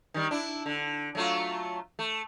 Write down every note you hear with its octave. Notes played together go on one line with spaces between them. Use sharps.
D#3 G3
D4 E4
D3
F#3 A3 F4
A3